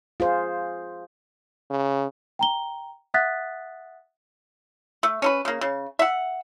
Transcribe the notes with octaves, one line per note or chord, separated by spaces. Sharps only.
F4 G#4 C5
C#3
G5 A#5 G7
E5 F#5 D#6 F#6 A6 B6
A3
C#4 A4 B4
C#3 A#3
C#3
E5 F#5